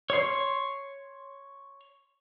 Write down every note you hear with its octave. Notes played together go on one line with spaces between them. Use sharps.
C#5 C6